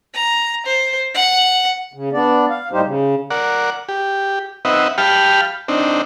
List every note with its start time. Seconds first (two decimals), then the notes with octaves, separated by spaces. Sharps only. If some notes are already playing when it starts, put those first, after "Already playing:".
0.14 A#5
0.66 C5
1.14 F#5
1.94 C#3
2.12 B3 D4 D5
2.50 F5
2.72 D#2 A2 G3 D#4 G4 C5
2.84 C#3
3.30 A#4 D5 F#5
3.89 G4
4.65 C4 D#4 B4 D#5 E5 F#5
4.98 G4 F5 G5 A5 B5 F6
5.68 C4 D4 D#4